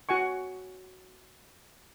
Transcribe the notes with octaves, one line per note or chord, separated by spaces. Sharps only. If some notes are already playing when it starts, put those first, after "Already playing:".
F#4 F#5 G#5 C#6